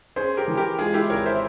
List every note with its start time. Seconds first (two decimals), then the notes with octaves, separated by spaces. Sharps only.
0.16 C#4 G#4 C5
0.37 G4 A#4
0.48 E3
0.57 G4 A#4
0.78 G#3 F4 G#4
0.94 E4 G4
1.10 G#1 A#4 C#5
1.26 C5 E5